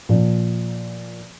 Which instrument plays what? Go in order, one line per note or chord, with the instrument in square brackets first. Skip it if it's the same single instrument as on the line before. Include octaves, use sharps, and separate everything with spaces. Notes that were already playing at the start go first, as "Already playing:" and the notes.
[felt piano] A#2 F3